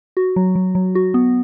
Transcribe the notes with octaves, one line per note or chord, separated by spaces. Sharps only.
F#4
F#3
F#3
F#3
F#4
B3